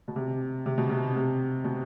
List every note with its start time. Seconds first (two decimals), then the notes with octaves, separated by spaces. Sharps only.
0.08 B2
0.16 C3
0.66 C3
0.78 B2
0.90 C3
1.16 C3
1.64 B2